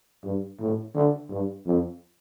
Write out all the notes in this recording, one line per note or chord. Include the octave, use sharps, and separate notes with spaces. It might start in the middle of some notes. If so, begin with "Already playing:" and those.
G2
A2
D3
G2
F2